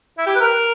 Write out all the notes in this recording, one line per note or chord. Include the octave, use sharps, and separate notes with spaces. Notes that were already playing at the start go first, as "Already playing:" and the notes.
E4
G4
B4
A#4